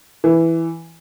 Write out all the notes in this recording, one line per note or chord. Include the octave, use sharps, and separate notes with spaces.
E3